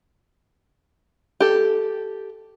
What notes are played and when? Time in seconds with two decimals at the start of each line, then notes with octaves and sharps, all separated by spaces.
1.40 G4 A4